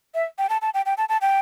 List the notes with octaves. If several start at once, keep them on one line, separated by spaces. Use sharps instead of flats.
E5
G5
A5
A5
G5
G5
A5
A5
G5